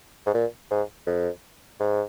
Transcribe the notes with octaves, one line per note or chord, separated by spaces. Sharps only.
G#2
A#2
G#2
F2
G#2